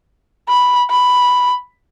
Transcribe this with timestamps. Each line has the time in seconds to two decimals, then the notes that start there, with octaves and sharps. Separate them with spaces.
0.49 B5
0.90 B5